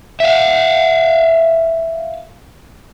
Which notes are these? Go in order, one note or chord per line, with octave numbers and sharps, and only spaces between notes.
E5 F5